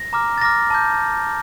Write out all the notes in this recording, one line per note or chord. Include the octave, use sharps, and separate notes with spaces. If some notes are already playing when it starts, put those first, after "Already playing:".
Already playing: A#6
A#5 D6 F6
A6
A#5 D6 F6 A#6
A5 D6 G6